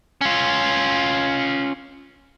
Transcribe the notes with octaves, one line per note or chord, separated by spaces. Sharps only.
C#4 F4